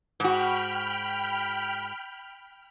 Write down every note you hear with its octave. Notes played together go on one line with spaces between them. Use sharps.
G#2 F#4 G5 B5 F6